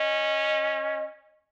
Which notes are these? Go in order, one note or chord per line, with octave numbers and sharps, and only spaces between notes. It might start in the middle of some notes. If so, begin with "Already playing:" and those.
Already playing: C#4 D#5